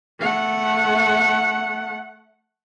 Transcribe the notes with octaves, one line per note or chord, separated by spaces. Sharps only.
A3 F#5